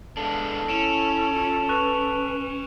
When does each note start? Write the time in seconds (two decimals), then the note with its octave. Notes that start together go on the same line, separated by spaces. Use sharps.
0.17 G#3 B3 D4 A4
0.68 C#4 E4 D7 E7 F7
1.33 F4
1.69 B4 C#6 F#6 F7